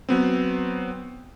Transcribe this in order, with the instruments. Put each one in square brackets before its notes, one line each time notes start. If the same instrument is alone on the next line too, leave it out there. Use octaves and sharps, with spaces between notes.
[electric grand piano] F#3 B3 C4